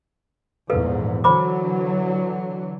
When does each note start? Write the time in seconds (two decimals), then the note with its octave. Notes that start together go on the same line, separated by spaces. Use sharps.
0.70 A#1 E2 G#2 A4 B4 F5
1.24 D3 E3 F#3 C5 B5 D6